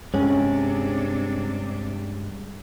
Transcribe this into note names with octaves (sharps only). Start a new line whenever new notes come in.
G2 C3 G#3 C#4 D4